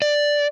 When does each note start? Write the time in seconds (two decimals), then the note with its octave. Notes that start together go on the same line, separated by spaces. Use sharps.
0.02 D5